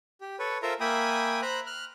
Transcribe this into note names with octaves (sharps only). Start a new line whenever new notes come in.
G4
A4 B4 C#5
F4 A4 A#4 C5 E5 A#5
A#3 E5 G5 G#5 B5 D#6
C5 A#5 B5 F#6
F6 F#6